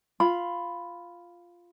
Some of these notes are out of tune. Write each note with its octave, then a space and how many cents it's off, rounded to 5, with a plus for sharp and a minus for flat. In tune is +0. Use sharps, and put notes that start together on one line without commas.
F4 +0 B5 +5